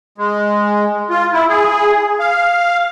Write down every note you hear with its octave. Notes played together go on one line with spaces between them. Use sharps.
G#3
F4
E4
G#4
F5